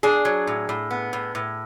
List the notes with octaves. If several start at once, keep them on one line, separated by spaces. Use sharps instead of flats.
D4 G#4
F#3
A2
A2
B3
A2
A2